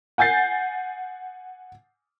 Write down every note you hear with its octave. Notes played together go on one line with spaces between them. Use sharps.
F#5 G#5 G6 A6 C7